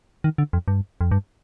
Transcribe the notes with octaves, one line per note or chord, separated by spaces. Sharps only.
D#3
D3
F2
G2
F2
G2